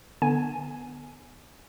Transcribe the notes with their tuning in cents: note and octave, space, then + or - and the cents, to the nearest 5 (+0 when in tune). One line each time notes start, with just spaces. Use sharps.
D3 +10 B3 +0 G#5 +0